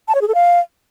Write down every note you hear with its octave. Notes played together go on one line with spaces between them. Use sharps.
A5
C#5
G#4
A4
F5